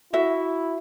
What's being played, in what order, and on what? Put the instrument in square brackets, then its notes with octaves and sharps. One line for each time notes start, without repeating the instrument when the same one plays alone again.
[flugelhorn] E4 [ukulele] F#4 E5